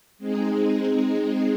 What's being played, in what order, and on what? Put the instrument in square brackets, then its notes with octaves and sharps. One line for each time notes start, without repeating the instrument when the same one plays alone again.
[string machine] G#3 C4 D#4 G#4